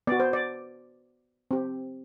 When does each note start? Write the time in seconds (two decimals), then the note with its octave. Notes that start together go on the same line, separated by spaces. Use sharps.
0.07 B3 F#4 D5
0.20 C5
0.33 D5
1.51 C4 G4